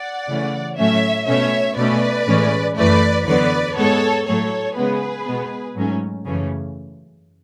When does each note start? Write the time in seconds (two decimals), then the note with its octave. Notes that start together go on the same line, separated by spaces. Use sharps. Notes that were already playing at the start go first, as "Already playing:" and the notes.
Already playing: D5 F#5
0.27 C#3 E3 A3 C#4
0.77 A2 F#3 A3 C#4 C#5 E5
1.27 B2 A3 C#4 C#5 E5
1.77 B2 A3 C#4 B4 D5
2.27 A2 E3 G#3 C#4
2.76 F#2 E3 A3 B4 D5
3.26 E2 D3 F#3 B3 B4 D5
3.76 G#2 G#3 B3 A4 C#5
4.26 A2 F#3 A3 A4 C#5
4.76 C#3 G#3 B3 G#4 B4
5.25 B2 G#3 B3
5.75 G#2 F#3 A3 C#4
6.25 F#2 C#3 E3 A3 C#4